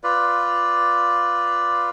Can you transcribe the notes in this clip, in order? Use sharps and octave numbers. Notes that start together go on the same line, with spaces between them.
F4 B4 D5